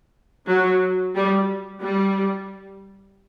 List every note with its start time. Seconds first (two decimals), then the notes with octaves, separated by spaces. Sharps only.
0.48 F#3
1.16 G3
1.83 G3